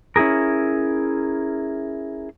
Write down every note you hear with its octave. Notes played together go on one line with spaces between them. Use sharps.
C#4 E4 F#4 G#4 A#4